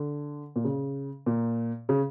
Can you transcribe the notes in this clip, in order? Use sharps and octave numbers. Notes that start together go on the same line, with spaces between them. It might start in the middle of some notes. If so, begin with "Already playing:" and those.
Already playing: D3
A#2
C#3
A#2
C#3